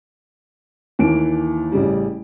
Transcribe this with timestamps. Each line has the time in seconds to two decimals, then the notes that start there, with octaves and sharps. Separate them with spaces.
0.99 D#2 E3 D7
1.72 A1 C#3 G3